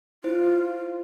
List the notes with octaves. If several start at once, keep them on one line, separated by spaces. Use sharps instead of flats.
E4 F4 C5